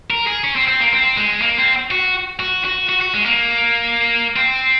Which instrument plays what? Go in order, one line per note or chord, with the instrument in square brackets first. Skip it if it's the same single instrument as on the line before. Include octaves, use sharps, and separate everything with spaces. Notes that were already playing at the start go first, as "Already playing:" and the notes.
[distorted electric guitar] A#4
G#4
C#4
C4
C4
A#3
C4
G#3
A#3
C4
F#4
F#4
F#4
F#4
F#4
G#3
A#3
C4